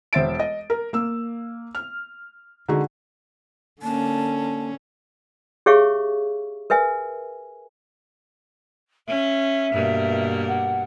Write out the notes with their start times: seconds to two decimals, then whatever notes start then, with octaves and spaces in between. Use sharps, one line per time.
0.13 E1 C5 E5 A6 D7
0.40 D#5
0.70 A#4
0.93 A#3 E6
1.75 F6
2.68 D3 G#3 D#4 F#4 G#4
3.82 D3 A#3 C#4 A5
5.66 G4 G#4 C#5 E5 F5 C#6
6.70 A#4 B4 E5 G#5
9.08 C#4 E5
9.73 G2 B2 A#3
10.48 F#5